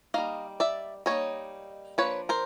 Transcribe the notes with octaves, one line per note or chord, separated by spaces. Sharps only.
G3 A#3 D#4 D#5 F5
D5 E5
G3 A#3 D#4 C#5 D#5
F3 A#3 D4 B4 C#5
A#4 C5